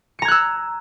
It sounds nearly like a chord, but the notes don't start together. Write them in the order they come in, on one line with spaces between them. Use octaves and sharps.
C#7 A#5 G#6 F#6 E6